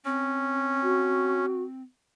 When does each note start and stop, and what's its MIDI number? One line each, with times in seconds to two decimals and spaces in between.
0.05 1.82 60
0.05 1.46 61
0.83 1.63 66